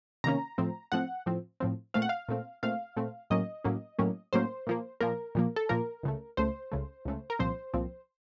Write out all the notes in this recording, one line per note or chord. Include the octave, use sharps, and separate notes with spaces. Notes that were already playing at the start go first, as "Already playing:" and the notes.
C3 D#3 A#3 C#4 A#5
A2 F3 C4
A2 F3 C4 F#5
A2 F3 C4
A2 F3 C4
A#2 A3 C4 F5
F#5
F5
A#2 A3 C4
A#2 A3 C4 F5
A#2 A3 C4
A2 F#3 A#3 C#4 D#5
A2 F#3 A#3 C#4
A2 F#3 A#3 C#4
A2 F#3 A#3 C#4 C5
A#2 F3 A#3
A#2 F3 A#3 A#4
A#2 F3 A#3
A4
A#2 F3 A#3 A#4
C#2 C#3 A3
C#2 C#3 A3 C5
C#2 C#3 A3
C#2 C#3 A3
A#4
C2 A#2 F3 C4 C5
C2 A#2 F3 C4